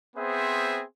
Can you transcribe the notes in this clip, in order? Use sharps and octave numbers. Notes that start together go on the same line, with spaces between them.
B3 C4 G#4 C5 E5